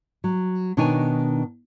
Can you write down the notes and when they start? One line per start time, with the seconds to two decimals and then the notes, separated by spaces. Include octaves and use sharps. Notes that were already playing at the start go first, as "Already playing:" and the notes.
0.24 F#3
0.77 B2 D#3 D4 D#4 C#5 G#5